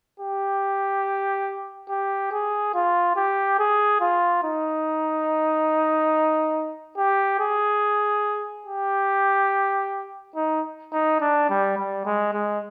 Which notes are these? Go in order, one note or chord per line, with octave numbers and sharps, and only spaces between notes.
G4
G4
G#4
F4
G4
G#4
F4
D#4
G4
G#4
G4
D#4
D#4
D4
G3
G3
G#3
G#3